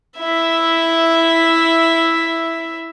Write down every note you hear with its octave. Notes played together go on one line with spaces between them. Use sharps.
E4 E5